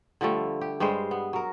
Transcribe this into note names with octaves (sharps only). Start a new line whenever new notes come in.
D3 F3 G3 A3
G4
G2 G3 G#3 C5
B3
F#3 A#4